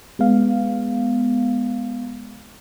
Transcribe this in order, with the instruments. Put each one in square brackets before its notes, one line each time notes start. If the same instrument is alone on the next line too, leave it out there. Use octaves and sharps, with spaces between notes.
[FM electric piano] G#3 B3 F5